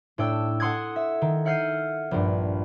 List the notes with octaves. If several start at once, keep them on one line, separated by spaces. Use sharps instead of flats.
A2 D4 G5 E6
A4 F#5 C6 D#6 F#6 G#6
E5
D#3
E5 F#5 F6 G6 C7 D#7
A#1 G2